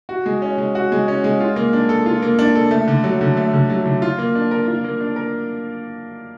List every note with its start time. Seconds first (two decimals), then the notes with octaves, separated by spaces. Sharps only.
0.09 F#4
0.26 G#3
0.42 C#4
0.58 G#3
0.75 F#4
0.92 G#3
1.08 C#4
1.24 G#3
1.40 F4
1.56 A#3
1.73 D4
1.89 A4
2.06 F4
2.22 A#3
2.39 D4
2.56 A4
2.71 A3
2.88 D3
3.04 F#3
3.21 D3
3.37 A3
3.53 D3
3.70 F#3
3.85 D3
4.02 F4
4.19 A#3
4.35 D4
4.51 A#4
4.67 F4
4.84 A#3
5.00 D4
5.16 A#4